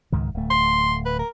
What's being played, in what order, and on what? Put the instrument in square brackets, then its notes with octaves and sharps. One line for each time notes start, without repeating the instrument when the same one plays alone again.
[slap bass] C#2 G#2 D#3
D1 A3
[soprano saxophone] C6
B4
A#4